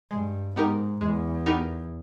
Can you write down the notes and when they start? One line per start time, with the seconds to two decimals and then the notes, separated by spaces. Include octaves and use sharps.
0.11 G2 G#3
0.55 G#2 B3 D#4 G4 A#4
1.01 E2 G#3
1.46 B3 D#4 G4 A#4